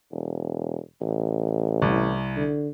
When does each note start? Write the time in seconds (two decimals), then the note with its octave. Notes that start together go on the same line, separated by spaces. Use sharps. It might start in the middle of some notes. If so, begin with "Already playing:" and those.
0.12 E1
1.01 A1
1.82 C2
2.36 D3